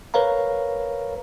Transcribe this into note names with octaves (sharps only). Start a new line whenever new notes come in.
A#4 B4 C#5 F5 A#5